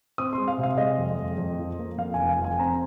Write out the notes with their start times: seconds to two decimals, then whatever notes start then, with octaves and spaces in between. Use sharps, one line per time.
0.18 C4 D#6
0.33 G#3 C6
0.48 F5
0.58 C3
0.63 F5
0.77 G#3 D#5
0.98 F2
1.18 F2
1.38 F2
1.59 F3
1.79 A#3
1.98 F2 F5
2.14 F1 G#5
2.29 F5
2.39 F2
2.44 G#5
2.59 C4 A#5